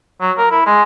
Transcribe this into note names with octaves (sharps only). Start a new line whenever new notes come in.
F#3
A#4
E4
G#3